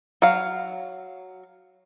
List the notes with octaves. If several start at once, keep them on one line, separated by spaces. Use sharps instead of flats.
F#3 F5